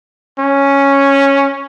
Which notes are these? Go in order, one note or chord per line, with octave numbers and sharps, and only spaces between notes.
C#4